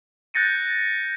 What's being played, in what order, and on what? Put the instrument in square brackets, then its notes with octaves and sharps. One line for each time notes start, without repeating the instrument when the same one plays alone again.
[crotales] F#6 G6 A6 A#6 C#7 D#7